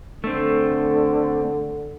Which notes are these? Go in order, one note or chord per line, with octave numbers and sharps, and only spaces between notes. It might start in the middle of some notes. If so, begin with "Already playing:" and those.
D3 A3 C4